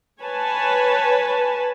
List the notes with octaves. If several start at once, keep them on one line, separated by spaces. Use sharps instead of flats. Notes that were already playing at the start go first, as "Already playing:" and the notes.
B4 C#5 G#5 A5